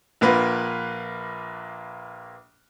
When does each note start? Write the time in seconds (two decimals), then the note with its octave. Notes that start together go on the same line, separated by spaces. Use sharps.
0.21 A#1 A#3 F4 B4 F#5